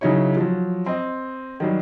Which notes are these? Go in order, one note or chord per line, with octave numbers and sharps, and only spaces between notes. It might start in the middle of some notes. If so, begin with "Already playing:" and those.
C#3 F#3 D#4 E4 C#5
F3 F#3
C4 D#5
D#3 F#3 G3